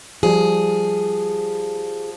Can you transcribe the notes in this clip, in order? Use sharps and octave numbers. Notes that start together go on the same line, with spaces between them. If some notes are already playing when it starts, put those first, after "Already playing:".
F3 G3 G#4